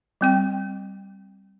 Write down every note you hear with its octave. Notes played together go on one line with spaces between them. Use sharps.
G3 C4 G5